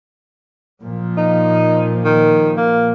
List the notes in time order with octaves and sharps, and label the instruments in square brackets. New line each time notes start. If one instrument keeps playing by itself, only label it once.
[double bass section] A#2 F3
[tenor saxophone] D#4
D#3
A#3